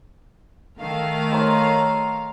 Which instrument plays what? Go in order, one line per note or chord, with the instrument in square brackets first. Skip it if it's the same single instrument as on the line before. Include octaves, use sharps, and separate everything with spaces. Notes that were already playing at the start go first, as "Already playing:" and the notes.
[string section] D#3 A3 F5
[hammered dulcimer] C#5 A#5 C6